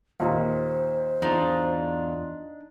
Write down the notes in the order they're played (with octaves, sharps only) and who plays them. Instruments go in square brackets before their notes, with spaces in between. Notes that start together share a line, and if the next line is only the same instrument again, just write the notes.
[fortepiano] D#2 A#2 [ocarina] C5
[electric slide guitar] E2 F4 [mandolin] D4 D#4